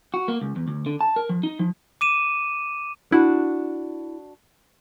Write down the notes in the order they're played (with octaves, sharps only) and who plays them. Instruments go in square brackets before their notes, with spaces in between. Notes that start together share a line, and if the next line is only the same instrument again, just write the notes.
[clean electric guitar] F#4
A#3
C#2
E2
D2
D3
A5
A#4
F3
D#4
F3
[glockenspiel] D6 D#7 E7
[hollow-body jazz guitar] D4 F#4 [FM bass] E4